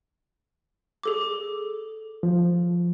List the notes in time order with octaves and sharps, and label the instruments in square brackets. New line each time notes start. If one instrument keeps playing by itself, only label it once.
[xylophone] G#4 A4 D6
[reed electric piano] F3